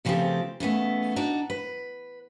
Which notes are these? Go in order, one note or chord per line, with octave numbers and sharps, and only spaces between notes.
E2 C#3 F3 A3 C4 G4
C#3 E3 A3 B3
D4 D#4 F#4
B4